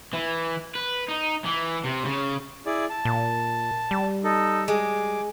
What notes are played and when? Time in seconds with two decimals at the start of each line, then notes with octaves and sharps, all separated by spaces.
0.13 E3
0.75 B4
1.08 D#4
1.45 E3
1.84 C3
2.05 C#3
2.66 E4 G#4 D5
2.90 A5
3.05 A#2
3.91 G3
4.24 D#4 A4
4.68 G#3 G#4 D6